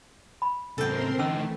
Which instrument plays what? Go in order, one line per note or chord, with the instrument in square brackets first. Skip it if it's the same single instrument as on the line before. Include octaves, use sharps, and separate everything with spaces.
[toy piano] B5
[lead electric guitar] A2 C#3 [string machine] C4 A#4 C6 [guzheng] A4 G5
[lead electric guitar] D3 D#4 [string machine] E3 A3 [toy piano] C#4 E6